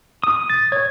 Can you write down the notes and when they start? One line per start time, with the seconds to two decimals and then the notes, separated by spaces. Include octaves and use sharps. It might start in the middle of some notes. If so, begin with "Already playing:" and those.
0.24 D#6
0.50 A6
0.72 C#5 G#6